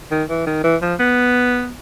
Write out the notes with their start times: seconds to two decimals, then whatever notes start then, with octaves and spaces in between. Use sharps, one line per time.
0.11 D#3
0.29 E3
0.47 D#3
0.64 E3
0.82 F3
0.99 B3